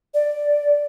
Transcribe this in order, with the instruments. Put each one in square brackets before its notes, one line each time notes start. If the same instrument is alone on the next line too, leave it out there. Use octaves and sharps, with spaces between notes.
[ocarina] D5